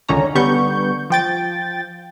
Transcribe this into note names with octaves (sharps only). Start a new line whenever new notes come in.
C#2 D3 D#3 C#4 C#5 A#5
D3 G3 B3 C#6 G6
F3 G5 A6